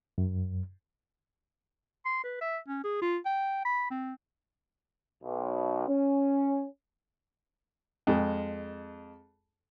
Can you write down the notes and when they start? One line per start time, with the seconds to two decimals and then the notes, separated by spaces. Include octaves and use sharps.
0.18 F#2
2.05 C6
2.24 B4
2.41 E5
2.68 C#4
2.84 G#4
3.02 F4
3.26 G5
3.65 B5
3.91 C4
5.23 B1
5.88 C#4
8.07 F2 G#3